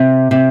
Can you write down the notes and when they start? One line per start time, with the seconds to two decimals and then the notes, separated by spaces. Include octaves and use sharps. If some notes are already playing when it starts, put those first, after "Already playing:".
Already playing: C3
0.31 C3